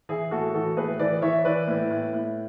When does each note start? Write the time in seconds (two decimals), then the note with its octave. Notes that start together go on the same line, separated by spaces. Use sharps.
0.09 E3 E4 G#4
0.31 A2 F#4 A4
0.54 E3 F#4 A4
0.77 A2 G#4 B4
0.99 E3 B4 D5
1.22 E3 C#5 E5
1.45 E3 B4 D5
1.67 A2
1.90 A2
2.13 A2